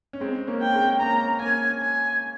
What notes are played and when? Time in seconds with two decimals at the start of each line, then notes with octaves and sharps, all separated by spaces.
0.13 C#4
0.20 G#3 C4
0.47 A#3 C#4
0.61 G5
0.74 G#3 C4
1.00 A#3 C#4 A#5
1.40 A#3 C#4 G#5
1.80 G#5